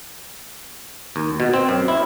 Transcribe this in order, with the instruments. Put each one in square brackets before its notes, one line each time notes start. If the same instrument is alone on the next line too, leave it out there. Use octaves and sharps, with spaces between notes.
[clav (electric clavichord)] D#2
B2
C4
F#2
E4